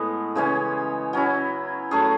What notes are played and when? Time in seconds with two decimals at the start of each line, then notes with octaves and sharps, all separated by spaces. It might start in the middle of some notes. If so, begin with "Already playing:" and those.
Already playing: A2 G#3 B3
0.35 C#3 E3 G#3 C#4
1.13 F#3 C#4 E4
1.91 F#3 A3 C#4 G#4